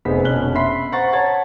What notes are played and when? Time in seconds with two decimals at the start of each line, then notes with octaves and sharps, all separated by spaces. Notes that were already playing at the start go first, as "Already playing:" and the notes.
0.05 F1 B3 G#4 C5 B6
0.23 F1 B2 C#4 D4 F#6 G7
0.55 E5 B5 C6 B6 C7
0.92 C5 F#5 A#5 C#6 A6
1.13 C#5 F#5 A5 A#5 G#6 A6